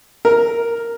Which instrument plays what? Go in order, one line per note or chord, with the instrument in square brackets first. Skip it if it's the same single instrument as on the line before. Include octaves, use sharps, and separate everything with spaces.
[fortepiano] A#4